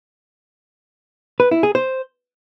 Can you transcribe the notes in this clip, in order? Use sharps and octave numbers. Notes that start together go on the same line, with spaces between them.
B4
E4
G#4
C5